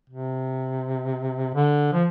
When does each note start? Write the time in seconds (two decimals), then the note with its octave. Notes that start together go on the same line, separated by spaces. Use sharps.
0.10 C3
1.54 D3
1.93 F3